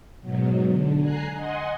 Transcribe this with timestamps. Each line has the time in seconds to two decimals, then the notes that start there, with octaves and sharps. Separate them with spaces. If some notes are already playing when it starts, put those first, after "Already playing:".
0.21 G#2 B2 F#3
0.66 D3
0.99 G#5 A#5 F#6 C7
1.33 D#5 F#5 G#5 C6